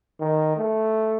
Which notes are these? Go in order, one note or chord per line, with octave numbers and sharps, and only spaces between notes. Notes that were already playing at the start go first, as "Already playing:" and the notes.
D#3
A3